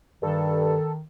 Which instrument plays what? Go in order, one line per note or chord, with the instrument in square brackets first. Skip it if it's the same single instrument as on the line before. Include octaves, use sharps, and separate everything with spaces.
[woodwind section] G2 [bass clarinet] D#3 [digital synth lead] A4